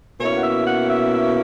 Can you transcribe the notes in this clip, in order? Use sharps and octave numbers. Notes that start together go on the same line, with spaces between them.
B2 A#3 C#4 E4 C#5
F#5
E5
F#5
E5
E5